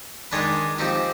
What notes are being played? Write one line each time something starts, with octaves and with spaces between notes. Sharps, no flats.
D#3 G#3 D4 G#4 B4
F3 C4 D#4 G4